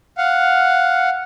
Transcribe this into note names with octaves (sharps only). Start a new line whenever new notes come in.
F5 F#5